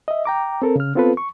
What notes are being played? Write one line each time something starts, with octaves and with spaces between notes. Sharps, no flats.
D#5 E5
G5 A#5 D6
C4 A4 A#4
C#3 F6
B3 C4 F4 A4 B4
C#6